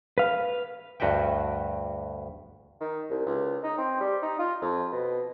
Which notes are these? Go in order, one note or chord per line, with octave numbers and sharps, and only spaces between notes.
B4 F5
D2 G2 F#4 B4 E5 G5
D#3
C2
C#2
D#4
C4
G3
D#4
F4
F2
B2